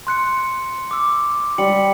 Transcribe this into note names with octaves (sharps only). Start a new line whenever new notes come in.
C6 F#6 C#7
D6 E6
G3 C#7 F#7